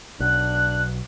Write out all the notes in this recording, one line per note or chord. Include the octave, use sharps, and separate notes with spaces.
B1 D4 F#6